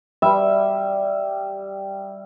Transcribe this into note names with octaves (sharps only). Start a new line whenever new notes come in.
G3 E5